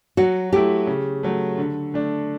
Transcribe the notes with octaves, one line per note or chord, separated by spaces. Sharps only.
F#3 F#4
A3 E4 G4
C#3
F#3 A3
D3
A3 D4